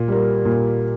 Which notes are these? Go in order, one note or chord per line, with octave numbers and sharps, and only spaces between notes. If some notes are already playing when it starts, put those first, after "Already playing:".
Already playing: A#2
G3 A#3
A#2